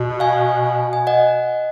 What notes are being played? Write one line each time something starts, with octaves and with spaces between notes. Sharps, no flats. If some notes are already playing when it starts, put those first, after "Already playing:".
Already playing: B2
F5 G#5
G#5
D#5 F#5